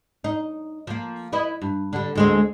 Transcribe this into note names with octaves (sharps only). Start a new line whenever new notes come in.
D#4
F3 A#3
E4 B4 D#5
G2
D3 G3
D2 G#3 C4